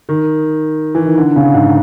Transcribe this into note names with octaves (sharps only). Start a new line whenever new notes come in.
D#3
E3
D#3
D3
C#3
G#2